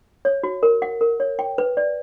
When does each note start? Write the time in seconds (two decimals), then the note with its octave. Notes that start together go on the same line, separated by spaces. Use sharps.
0.25 C#5
0.43 F#4
0.63 A#4
0.82 F#5
1.01 A#4
1.20 C#5
1.39 G5
1.58 B4
1.77 D5